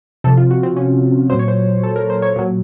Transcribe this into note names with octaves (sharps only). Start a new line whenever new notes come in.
C3 F3 A4
F4
F#4
C4
C#4
A#2 F#3 C5
C#5
C5
A4
A#4
C5
C#5
A#2 F#3